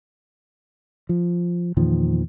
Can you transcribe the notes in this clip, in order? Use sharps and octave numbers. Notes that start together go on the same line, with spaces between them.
F3
E2 A#2 D#3 F3